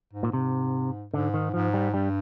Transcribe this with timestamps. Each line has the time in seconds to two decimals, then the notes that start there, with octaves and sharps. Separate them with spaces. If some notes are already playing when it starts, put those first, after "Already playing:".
0.13 G#2
0.23 A#2
0.33 G#2 C3
1.14 G#2 D3
1.34 D#3
1.54 G#2 F3
1.74 G3
1.94 G2 G3